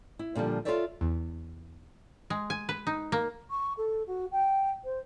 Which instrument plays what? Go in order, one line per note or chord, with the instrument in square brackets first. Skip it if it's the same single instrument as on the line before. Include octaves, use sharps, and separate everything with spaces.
[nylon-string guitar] E4
A#2 D3 F3 G3
F4 G#4 A4 C#5 D5 E5
[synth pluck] E2
[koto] G#3
G#5
B4
D#4
A#3
[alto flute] C#6
A4
F#4
G5
C5